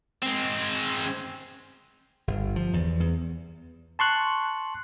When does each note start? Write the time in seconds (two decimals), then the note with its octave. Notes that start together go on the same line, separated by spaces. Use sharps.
0.23 G#3 C4
2.28 G1
2.56 F3
2.73 E2
3.00 E2
3.99 A5 C6 C#6 F#6